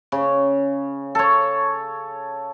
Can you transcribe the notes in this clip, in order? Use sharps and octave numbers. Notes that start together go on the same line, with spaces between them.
C#3
A4 C#5